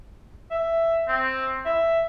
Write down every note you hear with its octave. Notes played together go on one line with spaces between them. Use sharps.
E5
C4
E5